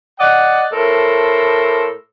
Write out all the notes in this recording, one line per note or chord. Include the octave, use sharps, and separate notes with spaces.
D5 D#5 F#5
A2 A4 A#4 C5